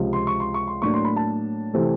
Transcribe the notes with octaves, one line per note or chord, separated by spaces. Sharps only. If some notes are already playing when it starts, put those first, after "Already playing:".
Already playing: C#2 C3 F3
C6
C#6
C6
C#6
C6
A2 F#3 A#3 D4 C#6
C6
B5
A5
C3 E3 A3 C4